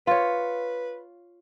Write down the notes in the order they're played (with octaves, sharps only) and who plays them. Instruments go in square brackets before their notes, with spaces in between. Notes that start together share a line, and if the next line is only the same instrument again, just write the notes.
[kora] F4 C#5 [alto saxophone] B4